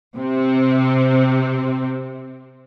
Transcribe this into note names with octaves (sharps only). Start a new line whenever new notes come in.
C3 C4